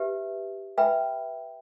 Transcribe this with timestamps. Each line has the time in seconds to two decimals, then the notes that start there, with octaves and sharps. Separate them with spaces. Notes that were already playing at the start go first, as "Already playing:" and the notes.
Already playing: G4 B4 E5
0.78 B4 E5 G5 B5